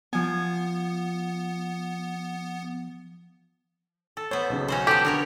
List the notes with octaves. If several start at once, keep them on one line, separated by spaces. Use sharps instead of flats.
F3 B3 G#5
A4
B3 C5 C#5
B1 C#3
C#4 F#4 C5
F3 B3 G4 A4 C5
D3 B3 A#4 C#5